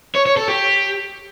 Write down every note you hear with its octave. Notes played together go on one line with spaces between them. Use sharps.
C#5
C#5
A4
G4